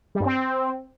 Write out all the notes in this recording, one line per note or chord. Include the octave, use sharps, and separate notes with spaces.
G3
G2
C4